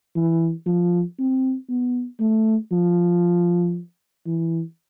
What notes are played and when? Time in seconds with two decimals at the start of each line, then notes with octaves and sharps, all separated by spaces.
0.15 E3
0.66 F3
1.18 C4
1.69 B3
2.20 A3
2.71 F3
4.26 E3